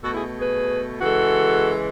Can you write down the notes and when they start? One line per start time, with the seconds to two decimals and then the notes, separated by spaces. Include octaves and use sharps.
0.02 B2 A3 F#4 A4
0.14 E4 G#4
0.39 G#4 B4
1.01 C#3 E3 G#3 F#4 A4